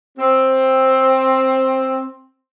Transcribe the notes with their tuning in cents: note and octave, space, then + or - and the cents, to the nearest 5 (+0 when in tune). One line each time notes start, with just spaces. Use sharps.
C4 +10